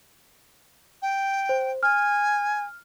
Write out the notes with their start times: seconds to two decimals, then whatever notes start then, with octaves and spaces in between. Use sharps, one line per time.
1.02 G5
1.49 C5
1.83 G#5 F6